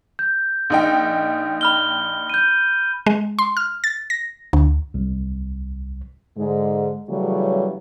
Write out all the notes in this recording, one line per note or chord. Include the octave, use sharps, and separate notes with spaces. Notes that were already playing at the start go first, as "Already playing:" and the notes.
G6
A#1 D#4 G5
B5 F6 G7
G6 D#7
G#3
C6
F6
A6
A#6
D2
C2
G#2 D3 G#3
C#3 E3 F#3 G3 A3 C#4